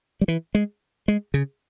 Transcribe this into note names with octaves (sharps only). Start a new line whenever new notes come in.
G3
E3
G#3
G#3
C#3